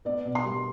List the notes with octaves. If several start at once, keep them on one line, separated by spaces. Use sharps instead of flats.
B3 D5
B2
C6
G3